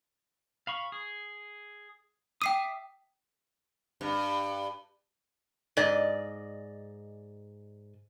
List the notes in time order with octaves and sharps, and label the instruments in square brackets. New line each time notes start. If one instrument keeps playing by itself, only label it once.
[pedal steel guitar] F5 B5 C#6
G#4
[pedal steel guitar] E5 D6 D#6 [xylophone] G5 C7 D#7
[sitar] G2
[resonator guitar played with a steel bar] G#2 D5 D#5